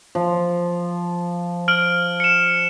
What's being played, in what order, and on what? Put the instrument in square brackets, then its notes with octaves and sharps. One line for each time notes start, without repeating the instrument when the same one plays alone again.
[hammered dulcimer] F3
[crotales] F6 D7 F#7
C#7 E7